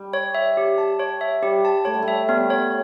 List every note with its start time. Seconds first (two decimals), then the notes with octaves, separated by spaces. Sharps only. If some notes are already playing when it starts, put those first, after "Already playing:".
Already playing: G3
0.13 C#5
0.35 E5
0.57 G4
0.78 A5
1.00 C#5
1.21 E5
1.43 G3 G4
1.65 A5
1.85 A3 C#5
1.94 G3
2.02 A3
2.08 E5
2.28 G3 B3
2.50 C#5